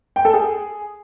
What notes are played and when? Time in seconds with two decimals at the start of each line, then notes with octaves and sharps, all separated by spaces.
0.16 G5
0.25 A4
0.34 G#4